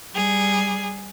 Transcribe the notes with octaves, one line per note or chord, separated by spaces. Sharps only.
G3 G#4